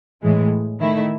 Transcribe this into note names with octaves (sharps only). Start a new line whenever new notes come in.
A2 E3 G#3
D#3 A3 E4